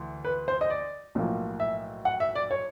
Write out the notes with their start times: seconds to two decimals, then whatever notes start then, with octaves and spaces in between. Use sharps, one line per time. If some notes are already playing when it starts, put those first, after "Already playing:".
Already playing: D2 E3
0.25 B4
0.48 C5
0.61 D#5
0.70 D5
1.15 B1 A2 F3 A#3
1.60 E5
2.05 F#5
2.20 E5
2.35 D5
2.51 C#5